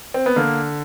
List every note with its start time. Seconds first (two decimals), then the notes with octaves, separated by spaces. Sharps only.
0.14 C4
0.26 B3
0.36 D3 A#3